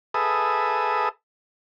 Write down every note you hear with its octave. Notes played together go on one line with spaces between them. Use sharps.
G#4 A4 B4 E5 D#6